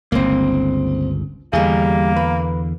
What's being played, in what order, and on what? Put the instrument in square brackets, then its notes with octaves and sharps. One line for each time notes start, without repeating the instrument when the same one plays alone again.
[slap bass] G1 C#2 [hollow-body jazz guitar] A#3 C4
[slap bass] E2 D3 [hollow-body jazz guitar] G3 G#4 [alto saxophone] A#3
[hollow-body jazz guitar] B4